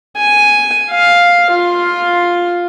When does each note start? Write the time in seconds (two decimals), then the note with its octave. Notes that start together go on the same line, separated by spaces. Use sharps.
0.17 G#5
0.91 F5
1.51 F4